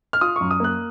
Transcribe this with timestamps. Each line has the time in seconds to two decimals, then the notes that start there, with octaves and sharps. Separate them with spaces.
0.13 F6
0.21 F4 D#6
0.36 F#2 C#6
0.51 D#6
0.60 A#3 F#6